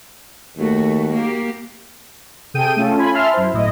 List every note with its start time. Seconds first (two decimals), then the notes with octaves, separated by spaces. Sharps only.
0.58 D#2 A3 F#4
1.13 A#3 G4
2.54 C3 G#4 A4 G5 D#7
2.76 A3 C#4 F4 A4
2.97 C#4 F4 G#5 B5
3.13 E5 A5 C6 F6
3.33 F#2 E4 C5
3.53 G1 A2 E4 D#5